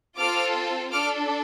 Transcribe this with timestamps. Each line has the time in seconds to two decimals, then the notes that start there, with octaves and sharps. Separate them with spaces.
0.16 C4 F4 A4 D6 F6
0.92 D4 A4 D6 F6